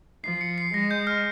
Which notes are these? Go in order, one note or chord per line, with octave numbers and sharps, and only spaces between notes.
F3 C7
C#7
C7
G#3 A#6
G6
F6